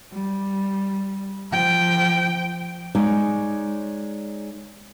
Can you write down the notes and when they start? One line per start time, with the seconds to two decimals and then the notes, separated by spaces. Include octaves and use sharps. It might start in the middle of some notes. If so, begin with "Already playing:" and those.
0.13 G3
1.51 F3 G5
2.95 G#3 D#4 C#5 D5